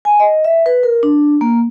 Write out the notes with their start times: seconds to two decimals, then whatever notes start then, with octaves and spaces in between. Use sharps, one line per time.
0.05 G#5
0.20 D#5
0.45 E5
0.66 B4
0.83 A#4
1.03 D4
1.41 A#3